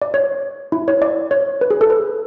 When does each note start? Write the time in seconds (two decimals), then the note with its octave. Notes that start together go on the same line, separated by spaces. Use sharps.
0.02 D5
0.14 C#5
0.72 E4
0.88 C#5
1.02 D5
1.31 C#5
1.61 B4
1.71 G#4
1.81 A4
1.90 B4